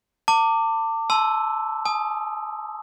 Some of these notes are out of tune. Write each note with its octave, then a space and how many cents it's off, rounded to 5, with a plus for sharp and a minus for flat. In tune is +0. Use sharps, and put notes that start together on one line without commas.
A5 +40 D6 +5
A5 -20 C6 -15 E6 +0
G#5 +40 D#6 +0